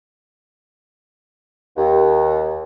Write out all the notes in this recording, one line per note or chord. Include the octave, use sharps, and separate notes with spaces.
D#2